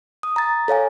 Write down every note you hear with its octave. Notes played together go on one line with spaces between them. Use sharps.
D#6
A#5 A6
A4 C#5 F5 G#5